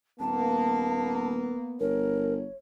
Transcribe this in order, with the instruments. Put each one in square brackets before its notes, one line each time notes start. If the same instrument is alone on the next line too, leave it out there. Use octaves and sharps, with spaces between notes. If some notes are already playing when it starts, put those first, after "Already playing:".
[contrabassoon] D#1 [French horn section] A#3 B3 [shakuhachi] A5
[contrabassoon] G1 [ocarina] A#4 [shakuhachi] C#5